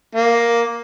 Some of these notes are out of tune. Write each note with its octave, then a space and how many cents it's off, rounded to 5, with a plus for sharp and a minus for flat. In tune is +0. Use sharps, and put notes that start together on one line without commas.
A#3 +5